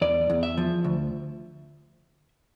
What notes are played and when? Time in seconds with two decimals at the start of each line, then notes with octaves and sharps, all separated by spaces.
0.01 E2 D5
0.30 E2
0.43 E5
0.58 F3
0.84 D2